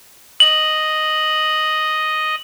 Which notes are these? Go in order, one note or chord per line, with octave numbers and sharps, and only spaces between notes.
D#5 F#7